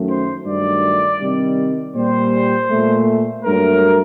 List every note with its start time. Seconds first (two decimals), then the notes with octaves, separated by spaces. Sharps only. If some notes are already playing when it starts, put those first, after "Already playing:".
Already playing: F#2 D#3 F#3 A3
0.08 C5
0.46 G2 D#3 F#3 A3 D5
1.20 C3 D#3 G3
1.95 A#2 G3 C5
2.71 A#2 A3
3.45 G2 F#3 A3 A#4